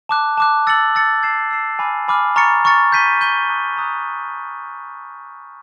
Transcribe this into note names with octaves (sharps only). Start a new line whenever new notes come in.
A5 D6 F#6
A5 D6 F#6
E6 A6 C#7 F#7
E6 A6 C#7 F#7
E6 G#6 C7 E7
E6 G#6 C7 E7
G#5 B5 D6 F6
G#5 B5 D6 F6
A#5 C#6 F6 A6 C#7
A#5 C#6 F6 A6 C#7
G6 B6 D#7 G7
G6 B6 D#7 G7
A#5 D#6 F#6
A#5 D#6 F#6